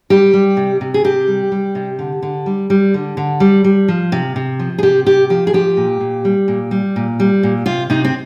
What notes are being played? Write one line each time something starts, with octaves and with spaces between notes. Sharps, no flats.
G3 G4
G3
C3
C3
G#4
C3 G4
G3
G3
C3
D3
D3
G3
G3
D3
D3
G3
G3
F3
C3
C3
F3
G#4
C3 G4
C3 G4
F3 G4
G#4
F3 G4
A#2
A#2
G3
A#2
G3
A#2
G3
A#2
C3 F4
C3 D#4
C4